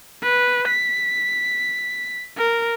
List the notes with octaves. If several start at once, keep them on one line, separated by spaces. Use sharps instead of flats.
B4
B6
A#4